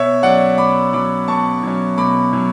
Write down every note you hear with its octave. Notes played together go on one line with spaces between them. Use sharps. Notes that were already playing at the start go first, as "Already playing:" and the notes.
Already playing: B2 C#5 E5
F#3 C#4 D5 F#5
B2 B5 D6
F#3 C#4 B5 D6
B2 A5 C#6
F#3 C#4
B2 B5 D6
F#3 C#4